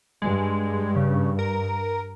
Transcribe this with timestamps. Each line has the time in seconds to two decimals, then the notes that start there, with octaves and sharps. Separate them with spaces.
0.22 G2 G#3
0.96 C#3
1.39 A#4